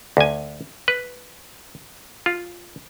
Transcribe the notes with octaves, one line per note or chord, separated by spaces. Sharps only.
D2 G#5
B4
F4